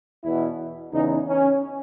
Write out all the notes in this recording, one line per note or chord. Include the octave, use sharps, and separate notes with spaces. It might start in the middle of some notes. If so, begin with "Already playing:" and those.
E2 B2 E4
E2 C#3 E3 D#4
C#4